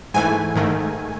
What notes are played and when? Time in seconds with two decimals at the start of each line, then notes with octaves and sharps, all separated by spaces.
0.14 G#2 E3 A3 G#5
0.55 G#2 D#3 A3